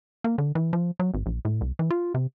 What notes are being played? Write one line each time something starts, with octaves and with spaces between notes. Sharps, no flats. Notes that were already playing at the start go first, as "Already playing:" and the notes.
A#3
D3
E3
F3
F#3
G#1
A#1
A2
C2
E3
F4
C3